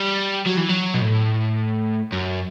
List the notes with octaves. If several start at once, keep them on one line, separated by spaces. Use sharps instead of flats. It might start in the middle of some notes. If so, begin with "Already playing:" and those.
Already playing: G3
F#3
E3
F#3
B2
A2
F#2